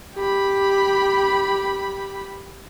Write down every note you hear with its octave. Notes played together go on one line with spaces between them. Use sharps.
G4 B5